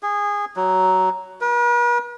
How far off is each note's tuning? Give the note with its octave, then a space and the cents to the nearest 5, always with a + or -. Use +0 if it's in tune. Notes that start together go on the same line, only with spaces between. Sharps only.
G#4 -20
F#3 +15
B4 -45